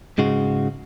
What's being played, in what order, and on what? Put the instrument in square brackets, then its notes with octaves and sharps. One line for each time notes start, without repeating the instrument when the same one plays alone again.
[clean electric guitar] G#2 C#3 G#3 F#4